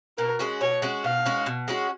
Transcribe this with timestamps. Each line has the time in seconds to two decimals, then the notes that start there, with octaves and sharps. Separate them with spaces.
0.18 B2 A#4
0.39 G#3 C#4 F#4
0.61 B2 C#5
0.82 G#3 C#4 F#4
1.04 B2 F5
1.26 G#3 C#4 F#4
1.46 B2
1.68 G#3 C#4 F#4